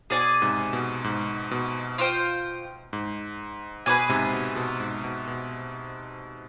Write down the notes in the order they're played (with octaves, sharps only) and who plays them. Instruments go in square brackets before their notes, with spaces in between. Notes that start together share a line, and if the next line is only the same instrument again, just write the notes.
[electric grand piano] B2 [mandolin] G#4 D5 F5 G#5
[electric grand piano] G#2 C3
B2
G#2
B2
[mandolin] F4 C5 G5
[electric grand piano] G#2
[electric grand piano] B2 [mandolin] G#4 B4 D5 G#5
[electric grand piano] G#2 C3
B2
B2
G#2
B2
B2